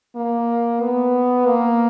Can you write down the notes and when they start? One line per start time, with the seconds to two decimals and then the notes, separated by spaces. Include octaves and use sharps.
0.16 A#3
0.81 B3
1.47 A#3